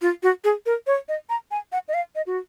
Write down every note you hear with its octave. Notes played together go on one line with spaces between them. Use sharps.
F4
F#4
G#4
A#4
C#5
D#5
A#5
G#5
F#5
D#5
F5
D#5
F#4